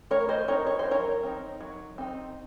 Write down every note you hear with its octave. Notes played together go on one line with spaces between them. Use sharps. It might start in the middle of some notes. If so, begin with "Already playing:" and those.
A3 A#4 C#5
C5 D#5
C4 D#4 A#4 C#5
C#5
C5
F#3
A#4 C#5
C4 D#4
F#3
C4 D#4